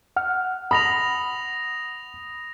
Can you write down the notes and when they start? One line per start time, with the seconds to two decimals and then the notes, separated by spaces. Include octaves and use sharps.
0.17 F#5 F6
0.71 B5 D#6 A#6 F7